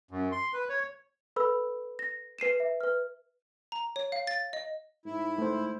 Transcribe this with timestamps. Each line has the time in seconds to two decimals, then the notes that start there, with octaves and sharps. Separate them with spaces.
0.11 F#2
0.32 C6
0.53 B4
0.69 C#5
1.36 A4 B4 B5 E6
1.99 A#6
2.39 B4 C7 D#7 E7
2.60 E5
2.81 B4 F6
3.72 A#5
3.96 C#5
4.12 F5
4.27 A6
4.53 D#5
5.06 G#2 E4
5.38 A3 C5